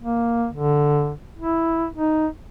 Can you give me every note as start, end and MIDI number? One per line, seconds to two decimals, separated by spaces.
0.01 0.47 58
0.53 1.13 50
1.39 1.86 64
1.93 2.27 63